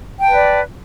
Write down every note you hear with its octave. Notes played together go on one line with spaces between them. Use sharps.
B4 D5 G5 A5